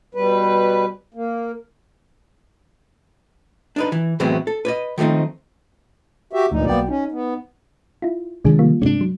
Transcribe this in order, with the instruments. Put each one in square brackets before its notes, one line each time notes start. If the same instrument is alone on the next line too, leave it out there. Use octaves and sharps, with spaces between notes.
[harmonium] B2 G3 B4
A#3
[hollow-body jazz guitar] D4 D#4 B4
E3
A2 E3 F#3 G#3 B3 C4
A4
B4 C#5 D#5
D#3 F3 A3 C4 D#4
[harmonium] F#4 G4 E5
[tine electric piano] D2 F3 [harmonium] G2 A#2 D#4
[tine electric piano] B1 F#4 G5 [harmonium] A#3 B3 D5
[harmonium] C#4 [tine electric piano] D#4
[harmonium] B3
[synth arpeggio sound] E4 F4
[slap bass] C3 D#3 F3 [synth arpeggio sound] G#3 D4 G#4
[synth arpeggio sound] G3 A#3 F4
[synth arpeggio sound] G2 C3 G#3 [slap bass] C#4 D4
[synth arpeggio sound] F#3